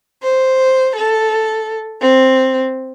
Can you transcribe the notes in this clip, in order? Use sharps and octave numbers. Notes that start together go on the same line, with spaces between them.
C5
A4
C4